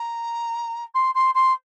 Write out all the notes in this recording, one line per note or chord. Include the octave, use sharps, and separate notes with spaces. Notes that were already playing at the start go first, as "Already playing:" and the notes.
Already playing: A#5
C6
C6
C6